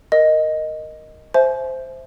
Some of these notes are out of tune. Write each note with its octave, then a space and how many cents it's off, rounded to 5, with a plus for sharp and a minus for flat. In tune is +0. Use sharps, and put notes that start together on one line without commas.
A#4 +0 D#5 +0
C5 +0 E5 +0 G#5 +40